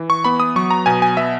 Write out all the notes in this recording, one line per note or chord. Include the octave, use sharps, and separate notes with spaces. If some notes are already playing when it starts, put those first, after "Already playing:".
Already playing: E3
C#6
B3 B5
D#6
F#3 C#6
A#5
B2 G#5
G#5
B3 E5